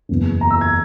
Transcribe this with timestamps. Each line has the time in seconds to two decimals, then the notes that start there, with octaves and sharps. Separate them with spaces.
0.09 F#1 E2 C#3
0.41 A#5
0.51 E6
0.61 G#6